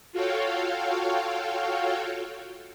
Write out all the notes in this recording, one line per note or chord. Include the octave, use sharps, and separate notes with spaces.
F4 F#4 A4 C#5 F5 G5